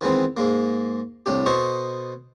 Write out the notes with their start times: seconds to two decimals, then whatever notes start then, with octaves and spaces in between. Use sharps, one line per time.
0.01 D#3 E3 G#3 B3 C4
0.37 G#2 G#3 A#3
1.26 C2 A2 D4 G4
1.46 B2 A4 C5 D#5 C#6